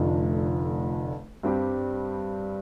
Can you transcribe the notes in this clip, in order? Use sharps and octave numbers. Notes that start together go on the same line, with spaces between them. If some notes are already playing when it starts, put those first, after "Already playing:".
Already playing: F1 F2 D3 A3
G2 G3 C4 G4